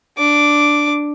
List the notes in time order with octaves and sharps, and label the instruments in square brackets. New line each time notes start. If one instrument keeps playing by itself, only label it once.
[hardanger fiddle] D4 D6